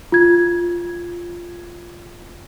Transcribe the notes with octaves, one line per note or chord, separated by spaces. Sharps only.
F4 G#6